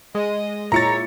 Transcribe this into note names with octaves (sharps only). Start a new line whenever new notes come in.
G#3 D#5
A#2 E4 C#5 A#5 A6 C#7